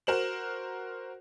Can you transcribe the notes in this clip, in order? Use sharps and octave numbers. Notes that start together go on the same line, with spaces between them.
F#4 A#4 C5 E7 F#7